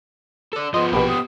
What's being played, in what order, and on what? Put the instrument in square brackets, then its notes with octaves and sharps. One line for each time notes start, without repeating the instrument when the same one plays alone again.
[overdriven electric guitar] A4 D5
[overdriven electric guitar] F3 B3 [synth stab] D#5 [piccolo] C6
[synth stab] A#1 B2 [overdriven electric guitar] B3 G4 [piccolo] B5
[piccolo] D#6